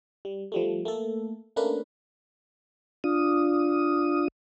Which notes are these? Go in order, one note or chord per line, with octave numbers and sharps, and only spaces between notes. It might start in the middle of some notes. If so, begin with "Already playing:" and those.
G3
F3 G3 A3
A3 A#3 A4
A3 A#3 C#4 D4 A#4 B4
D4 F4 D#6